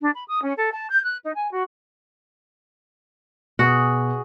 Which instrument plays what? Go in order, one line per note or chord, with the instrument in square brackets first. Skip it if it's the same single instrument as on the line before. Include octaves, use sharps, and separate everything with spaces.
[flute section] D4
B5
D#6
C#4
A4
A5
G6
F#6
D#4
G#5
F#4
[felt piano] B2 [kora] F#4 [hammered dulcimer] G#4